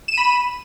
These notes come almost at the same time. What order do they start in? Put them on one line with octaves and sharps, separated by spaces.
E7 D#7 B5